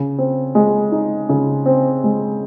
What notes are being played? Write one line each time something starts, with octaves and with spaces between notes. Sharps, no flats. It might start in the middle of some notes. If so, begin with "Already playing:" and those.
Already playing: C#3
C4
G#3
D#4
C#3
C4
G#3